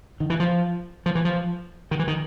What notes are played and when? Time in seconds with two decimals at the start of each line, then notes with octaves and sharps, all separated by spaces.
0.20 D#3
0.30 E3
0.40 F3
1.06 F3
1.15 E3
1.25 F3
1.91 D#3
1.99 E3
2.07 D#3